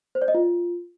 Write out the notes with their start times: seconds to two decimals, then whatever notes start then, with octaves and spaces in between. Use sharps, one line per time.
0.15 C5
0.22 D5
0.28 D#5
0.34 F4